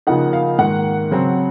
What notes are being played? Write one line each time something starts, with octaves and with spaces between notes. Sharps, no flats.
C#3 F3 A#3 D#4 F#5
F5
G#2 D#3 A#3 F#5
C#3 F#3 C4